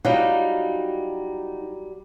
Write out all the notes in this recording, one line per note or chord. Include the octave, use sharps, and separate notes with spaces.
F#3 G3 D#4 F4 D#5